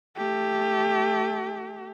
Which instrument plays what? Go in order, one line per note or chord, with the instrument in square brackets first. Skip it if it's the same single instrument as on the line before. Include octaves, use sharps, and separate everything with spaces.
[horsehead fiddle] A3 G4